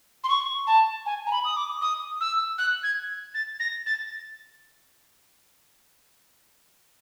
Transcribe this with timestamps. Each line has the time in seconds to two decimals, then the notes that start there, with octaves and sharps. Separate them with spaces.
0.24 C6
0.29 C#6
0.67 A5
1.06 G#5
1.27 A#5
1.31 B5
1.45 D#6
1.57 D6
1.81 D#6
2.21 E6
2.58 F#6
2.83 G#6
3.34 A6
3.60 A#6
3.86 A6